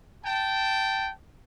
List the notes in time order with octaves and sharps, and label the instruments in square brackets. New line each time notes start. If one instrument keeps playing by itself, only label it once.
[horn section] G5 A5